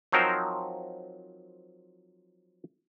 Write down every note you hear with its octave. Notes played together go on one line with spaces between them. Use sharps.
F3 F#3 C4 D#4 A#4 C5